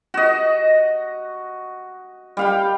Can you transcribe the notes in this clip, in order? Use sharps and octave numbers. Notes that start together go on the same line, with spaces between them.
F#4 D#5
G3 F5 G5